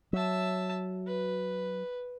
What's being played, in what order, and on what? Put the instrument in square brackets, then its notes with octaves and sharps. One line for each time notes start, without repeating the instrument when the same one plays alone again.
[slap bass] F#3 [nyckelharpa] E5 A5
[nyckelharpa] B4